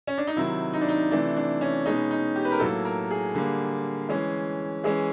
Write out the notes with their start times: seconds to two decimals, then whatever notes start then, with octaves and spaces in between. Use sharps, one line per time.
0.07 C#4
0.18 D4
0.27 D#4
0.36 C3 D#3 F#3 E4
0.74 D#4
0.81 D4
0.89 D#4
1.11 C3 E3 A3 D4
1.36 D4
1.61 C#4
1.86 B2 G#3 C#4 D#4
2.11 D#4
2.36 G4
2.45 B4
2.52 A#4
2.60 A2 F#3 A#3 A4
2.85 A#4
3.10 G#4
3.35 D3 G3 A#3
4.09 E3 G#3 C#4
4.84 E3 G#3 C#4 G#4